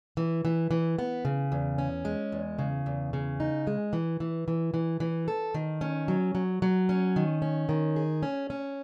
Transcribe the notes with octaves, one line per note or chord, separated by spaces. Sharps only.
E3
E3
E3
B3
C#3
E2
C#4
G#3
E2
C#3
E2
C#3
D#4
G#3
E3
E3
E3
E3
E3
A4
D#3
C#4
F#3
F#3
F#3
C#4
D#3
C#4
D#3
G#4
C#4
C#4